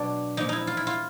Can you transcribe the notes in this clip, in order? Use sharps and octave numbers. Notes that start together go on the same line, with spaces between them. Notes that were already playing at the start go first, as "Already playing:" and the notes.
Already playing: B2 F#3 D4
A#2 F3 G#3 D#4
D#4 E4
F4
E4
F4